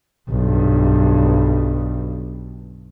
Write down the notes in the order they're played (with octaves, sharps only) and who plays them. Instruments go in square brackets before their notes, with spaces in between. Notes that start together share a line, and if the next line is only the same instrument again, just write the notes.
[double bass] B1 G2